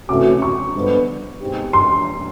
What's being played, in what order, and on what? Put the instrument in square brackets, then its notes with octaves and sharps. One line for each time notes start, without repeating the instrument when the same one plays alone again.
[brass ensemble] C3 E3 A3 C#4 F#4 [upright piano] D6
[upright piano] C#6
[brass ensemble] G2 D3 F3 G#3 B3
B2 G#3 C4 D#4 G4
[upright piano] C6